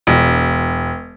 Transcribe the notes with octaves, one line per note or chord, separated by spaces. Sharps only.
E1